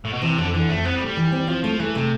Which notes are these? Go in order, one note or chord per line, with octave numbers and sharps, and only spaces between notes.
A2
B2
C3 E3
F2 D3
D3 E3
F2 A3
B3 C4
G3
A3
G3
E3
C4
F3 C4
F3 A3
E3 A3
C3 A3